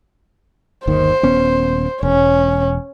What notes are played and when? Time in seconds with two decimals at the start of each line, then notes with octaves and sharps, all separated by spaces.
0.87 G1 D#2 D#3 C5
1.23 D#1 B3 C#4
2.03 E1 C#4